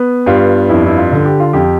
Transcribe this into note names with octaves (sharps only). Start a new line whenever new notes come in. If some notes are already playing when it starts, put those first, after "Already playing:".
Already playing: B3
G2 F4
F2 E4
E4
F4
D3
G4
F4
F2 G4